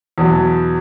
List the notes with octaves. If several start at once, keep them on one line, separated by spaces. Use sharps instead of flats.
E2 B2 F#3